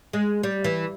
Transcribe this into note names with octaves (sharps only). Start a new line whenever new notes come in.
G#3
G3
E3